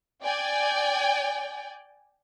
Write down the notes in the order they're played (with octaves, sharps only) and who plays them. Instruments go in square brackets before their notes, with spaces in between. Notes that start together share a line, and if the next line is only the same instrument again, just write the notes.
[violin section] D5 G5 G#5